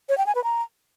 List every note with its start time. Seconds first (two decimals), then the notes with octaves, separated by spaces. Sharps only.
0.09 C#5
0.18 G5
0.26 G#5
0.35 B4
0.44 A#5